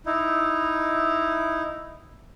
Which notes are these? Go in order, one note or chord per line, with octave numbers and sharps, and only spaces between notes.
D#4 E4